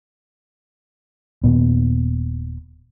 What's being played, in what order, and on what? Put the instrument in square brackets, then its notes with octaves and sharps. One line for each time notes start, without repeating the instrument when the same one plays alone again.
[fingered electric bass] D#1 A#2 D#3 B3